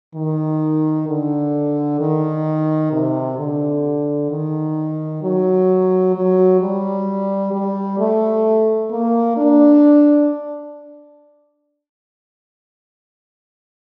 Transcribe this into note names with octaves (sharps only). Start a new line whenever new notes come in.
D#3
D3
D#3
C3
D3
D#3
F#3
F#3
G3
G3
A3
A#3
D4